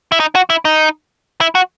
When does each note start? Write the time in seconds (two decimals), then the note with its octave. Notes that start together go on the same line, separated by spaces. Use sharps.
0.12 E4
0.20 D#4
0.35 F#4
0.50 E4
0.65 D#4
1.41 E4
1.55 F#4